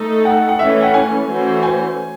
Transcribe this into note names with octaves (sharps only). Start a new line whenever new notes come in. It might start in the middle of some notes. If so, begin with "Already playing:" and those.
Already playing: A3 D#4 A4
F#5
F#5
E3 A3 C#4 E5
F#5
G#5
E3 A3 C#4 F#4 C5
G#5